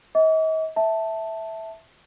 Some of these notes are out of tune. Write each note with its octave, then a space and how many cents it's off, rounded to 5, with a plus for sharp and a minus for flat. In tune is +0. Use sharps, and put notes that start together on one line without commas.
D#5 +40 D6 -40
E5 -10 A5 +0